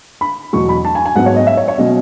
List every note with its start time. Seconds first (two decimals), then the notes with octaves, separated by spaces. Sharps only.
0.21 B5
0.53 E2 B2 F#3 C#6
0.69 B5
0.85 A5
0.95 G#5
1.05 G#5
1.15 G#2 F#3 B3 F#5
1.26 C#5
1.36 D#5
1.47 E5
1.57 C#5
1.68 C#5
1.78 B2 F#3 C#4 D#5